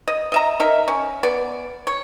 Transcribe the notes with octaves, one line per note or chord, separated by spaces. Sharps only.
D#5
D#5 E5 A#5
D#4 A#4 E5
C#4
B3 D5
C#5